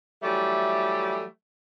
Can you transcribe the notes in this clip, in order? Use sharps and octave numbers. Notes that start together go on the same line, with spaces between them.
E3 F#3 G3 A3